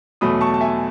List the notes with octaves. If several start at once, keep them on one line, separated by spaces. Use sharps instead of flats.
E2 B2 F#3 A3 B5 D#6
A5 C#6
A5
E5 G#5